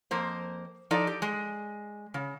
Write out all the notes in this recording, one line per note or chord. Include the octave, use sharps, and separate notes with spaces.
F2 A#3 C5
F3 D#4 A4 D5
G4
G#3
C#3